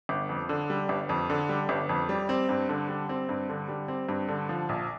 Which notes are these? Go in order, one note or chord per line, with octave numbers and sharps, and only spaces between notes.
G1
F2
D3
G3
G1
F2
D3
G3
G1
F2
G3
C4
G2
D3
G3
C4
G2
D3
G3
C4
G2
D3
F3
A#1